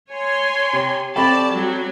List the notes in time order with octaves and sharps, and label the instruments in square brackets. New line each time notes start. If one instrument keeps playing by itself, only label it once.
[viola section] C#5 G#5 C6
[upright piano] C3
[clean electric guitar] C4 A4 [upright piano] G4 B5 C#6 [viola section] D5 A5
[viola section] F#3 G3 F#4